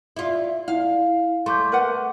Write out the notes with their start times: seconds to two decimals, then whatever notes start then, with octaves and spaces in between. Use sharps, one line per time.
0.17 E4 F4
0.68 E4 F5
1.46 A3 C6 D6 G6
1.72 A#4 B4 F#5